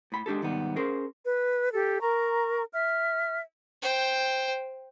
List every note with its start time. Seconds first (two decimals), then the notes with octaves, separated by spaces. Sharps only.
0.12 A2 B5
0.26 G#3 D4 G4 A4
0.41 C2 G#2 D#3 G3 B3
0.76 C#4 G#4 A#4 C5
1.25 B4
1.72 G4 A4
2.01 A#4 A#5 C#6
2.72 E5 F6
3.82 C5 G5